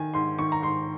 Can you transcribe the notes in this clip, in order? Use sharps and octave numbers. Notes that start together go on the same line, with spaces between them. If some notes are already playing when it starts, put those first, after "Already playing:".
Already playing: D#3 G#5
G#2 C6
D#3 C#6
A#5
G#2 C6